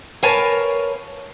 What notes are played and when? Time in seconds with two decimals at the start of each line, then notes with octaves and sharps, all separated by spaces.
0.23 A#4 B4 C#5 F5 G#5 A5